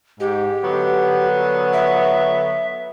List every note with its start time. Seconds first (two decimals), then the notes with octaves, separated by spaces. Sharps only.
0.20 G#2 G4
0.63 D3 F#3 B3
1.73 E5